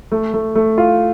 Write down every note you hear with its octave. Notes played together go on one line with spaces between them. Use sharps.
A3
A3
A3
F4